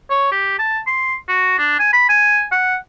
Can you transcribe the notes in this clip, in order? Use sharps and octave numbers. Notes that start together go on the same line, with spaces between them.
C#5
G4
A5
C6
F#4
D4
G#5
B5
G#5
F#5